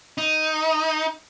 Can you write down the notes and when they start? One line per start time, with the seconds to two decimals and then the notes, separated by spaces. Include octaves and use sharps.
0.18 D#4